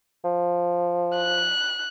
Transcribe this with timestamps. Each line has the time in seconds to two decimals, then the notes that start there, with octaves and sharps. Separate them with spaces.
0.24 F3
1.17 F#6